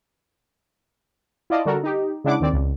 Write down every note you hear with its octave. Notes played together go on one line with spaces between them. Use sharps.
E4 F4 D5 D#5 A5
D3 G3 F#4 A4 A#4
D#4 G4
C#3 G#3 D4 E4 F#5 D6
D#2 D#3 C4 D5
C#2